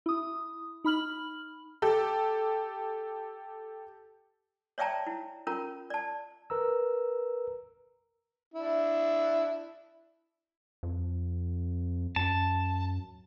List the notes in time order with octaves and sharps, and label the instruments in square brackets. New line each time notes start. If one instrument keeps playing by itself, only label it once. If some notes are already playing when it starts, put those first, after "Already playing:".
[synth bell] E4 D#6
D#4 B5 F6 F#7
[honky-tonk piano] G4 A4
[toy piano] C#5 D5 E5 G5 A5 A#5
E4
C#4 F4 A#4 A#5
D5 A5
[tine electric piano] A#4 B4 A#5 E6
[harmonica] D4 E4
[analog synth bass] F2
[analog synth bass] F#2 [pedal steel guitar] A5